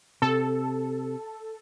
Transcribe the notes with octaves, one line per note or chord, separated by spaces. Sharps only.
C3 A4